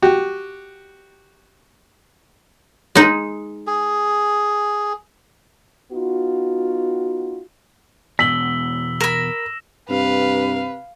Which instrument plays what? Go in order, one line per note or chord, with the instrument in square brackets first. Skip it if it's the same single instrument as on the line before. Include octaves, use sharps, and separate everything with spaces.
[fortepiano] F#4 G4
[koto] G#3 D#4
[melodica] G#4
[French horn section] B3 D#4 F4 F#4
[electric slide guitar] E2 B2 [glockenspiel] E6 F#7 G7 [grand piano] B6
[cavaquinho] A#4 B5 [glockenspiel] E6 A#6 E7
[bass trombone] G2 [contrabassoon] C3 [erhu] B4 [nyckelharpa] F5